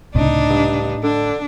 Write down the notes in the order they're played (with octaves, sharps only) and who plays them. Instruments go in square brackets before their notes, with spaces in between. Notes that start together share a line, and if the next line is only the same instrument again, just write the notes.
[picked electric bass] C#2 C3 [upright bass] A2 [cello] D4 D#4
[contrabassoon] G2
[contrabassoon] D3 [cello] D4